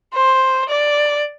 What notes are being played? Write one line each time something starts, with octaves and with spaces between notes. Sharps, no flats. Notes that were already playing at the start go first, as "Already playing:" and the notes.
C5
D5